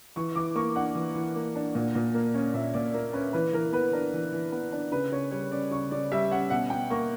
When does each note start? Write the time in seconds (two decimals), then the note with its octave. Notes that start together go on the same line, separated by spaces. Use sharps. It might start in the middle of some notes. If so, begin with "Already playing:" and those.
0.16 E3 C#6
0.36 E3 D6
0.55 A#3 C#6
0.75 D4 F#5
0.95 E3
1.15 E3
1.36 A#3
1.56 D4
1.75 A#2
1.95 A#2
2.14 A#3
2.34 C#4
2.54 A#2 E5
2.74 A#2 D5
2.94 A#3
3.13 C#4 B4
3.33 E3 B4
3.53 E3 A#4
3.73 B3 B4
3.93 D4 A#4
4.13 E3
4.32 E3
4.52 B3
4.72 D4
4.92 C#3 B4
5.12 C#3 C#5
5.31 G3 C#5
5.52 C#4 D5
5.71 C#3 C#6
5.91 C#3 D5
6.12 G3 E5
6.31 C#4 F#5
6.50 B2 F#5
6.70 B2 G5
6.90 A#3 C#6